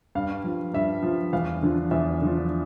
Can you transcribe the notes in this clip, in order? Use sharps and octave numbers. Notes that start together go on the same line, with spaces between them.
G2 F5
F3
G2 E5
F3
E2 F5
D3 F3
E2 E5
D3 F3